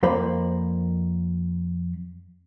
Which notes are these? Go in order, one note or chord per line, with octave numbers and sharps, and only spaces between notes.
F2 A#3 C5 D5 B5 C6